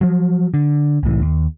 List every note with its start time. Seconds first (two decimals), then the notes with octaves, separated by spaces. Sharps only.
0.01 F3 F#3
0.54 D3
1.03 C2 A2 E3
1.21 D#2